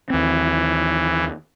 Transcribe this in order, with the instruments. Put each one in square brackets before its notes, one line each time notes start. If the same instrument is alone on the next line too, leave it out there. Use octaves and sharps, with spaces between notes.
[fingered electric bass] D#2 C4 [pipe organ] E3